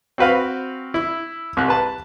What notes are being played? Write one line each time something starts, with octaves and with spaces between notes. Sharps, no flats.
C4 F#4 B4 F5
E4
C2 F#6
B4 A5